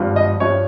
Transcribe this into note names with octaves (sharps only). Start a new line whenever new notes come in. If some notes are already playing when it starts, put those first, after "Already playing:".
Already playing: G#1 G2 F3
D#5
G2 F3 C#5